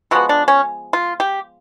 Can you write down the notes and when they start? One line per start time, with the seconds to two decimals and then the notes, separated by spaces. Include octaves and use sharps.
0.11 D3 F3 G#3 B3 F#4
0.29 D4
0.48 C#4
0.93 F4
1.20 G4